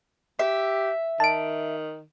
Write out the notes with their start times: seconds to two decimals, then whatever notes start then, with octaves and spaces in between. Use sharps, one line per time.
0.39 G4 E5
1.20 D#3 A5 D7